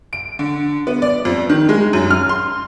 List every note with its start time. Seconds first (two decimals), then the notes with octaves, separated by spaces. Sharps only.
0.13 D7
0.39 D3
0.87 B3
1.02 D5
1.25 F2
1.50 D#3
1.69 G#3
1.93 F#2
2.11 F6
2.29 C6